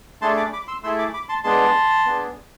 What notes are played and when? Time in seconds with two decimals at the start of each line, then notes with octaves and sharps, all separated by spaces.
0.22 A3 D4 G#4 A5 C6
0.37 B5 D6
0.53 B5 D6
0.68 C6 E6
0.83 A3 E4 G#4 C6 E6
0.98 B5 D6
1.14 B5 D6
1.29 A5 C6
1.43 G#3 B3 D4 G#4 A5 C6
2.06 B3 D4 G#4